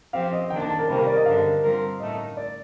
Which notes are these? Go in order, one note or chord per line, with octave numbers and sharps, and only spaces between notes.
F3 C4 G4 F5
D#5
D#3 A#3 D4 G5
A5
A5
A#4
C3 D#3 G3 A#3 C5
A#4
D5
D#5
G2 D3 G3 D4 A4 F5
D3 G3 C4 F4 A#4
A2 A3 D#4 D#5
D5